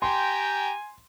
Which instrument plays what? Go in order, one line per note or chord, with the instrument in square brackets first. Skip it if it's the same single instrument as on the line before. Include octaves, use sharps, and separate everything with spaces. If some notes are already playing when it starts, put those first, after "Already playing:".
[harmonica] G4 G5 A#5 [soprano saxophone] G#5 [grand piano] C6